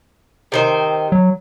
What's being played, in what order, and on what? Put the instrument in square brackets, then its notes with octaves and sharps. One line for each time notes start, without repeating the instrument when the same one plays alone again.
[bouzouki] C3 D#3 C5
[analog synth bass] F#3